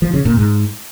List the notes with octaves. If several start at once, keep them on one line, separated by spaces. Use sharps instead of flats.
F3
C#3
A#2
G#2